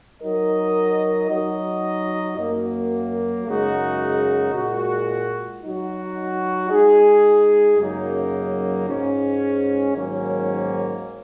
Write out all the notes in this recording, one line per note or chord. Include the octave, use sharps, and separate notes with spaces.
F#3 D#4 A#4 D#5
F#3 D#4 F#4 D#5
F#2 F#3 A#3 F#4
F#2 C#3 G#3 D#4 F#4
A#2 G#3 F#4
F#3 D#4 F#4
G#3 D#4 G#4
F#2 C#3 F#3 A#3 D#4
G#2 G#3 C#4
G#2 D#3 F#3 A#3 C#4